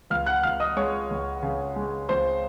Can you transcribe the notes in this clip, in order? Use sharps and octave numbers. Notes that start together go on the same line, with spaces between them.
C#2 F5 F6
F#5 F#6
C#2 F5 F6
D#5 D#6
G#3 C#5 C#6
C#2
C#3
G#3
C#2 C5 C6